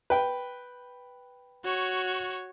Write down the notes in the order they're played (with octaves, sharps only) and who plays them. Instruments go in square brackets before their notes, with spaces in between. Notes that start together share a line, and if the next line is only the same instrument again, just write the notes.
[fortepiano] B4 G5
[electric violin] F#4 C#5